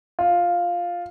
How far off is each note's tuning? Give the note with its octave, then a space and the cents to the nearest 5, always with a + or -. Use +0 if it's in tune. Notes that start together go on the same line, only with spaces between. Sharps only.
F4 +5